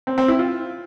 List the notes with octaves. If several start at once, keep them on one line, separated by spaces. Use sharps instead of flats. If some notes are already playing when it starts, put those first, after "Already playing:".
C4
C4
E4
F4